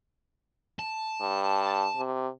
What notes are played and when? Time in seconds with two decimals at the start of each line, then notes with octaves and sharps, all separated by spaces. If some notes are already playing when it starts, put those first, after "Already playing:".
0.79 A5
1.21 G2
1.96 C3